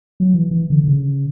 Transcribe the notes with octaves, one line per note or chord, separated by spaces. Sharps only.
F#3
E3
E3
D3
D3
C#3